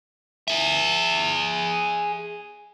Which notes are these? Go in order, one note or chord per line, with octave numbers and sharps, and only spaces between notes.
G#4 E5